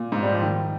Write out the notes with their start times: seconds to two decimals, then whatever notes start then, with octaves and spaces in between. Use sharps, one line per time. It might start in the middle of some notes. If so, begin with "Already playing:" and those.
Already playing: A#2
0.12 G#2
0.23 G3
0.33 F3
0.42 D#3